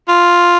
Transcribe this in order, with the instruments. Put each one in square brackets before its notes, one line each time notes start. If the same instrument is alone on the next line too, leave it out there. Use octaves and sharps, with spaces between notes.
[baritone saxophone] F4